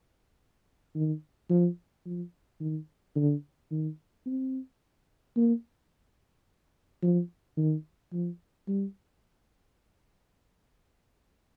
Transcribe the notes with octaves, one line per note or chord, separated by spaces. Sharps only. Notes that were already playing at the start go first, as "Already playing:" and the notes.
D#3
F3
F3
D#3
D3
D#3
C4
A#3
F3
D#3
F3
G3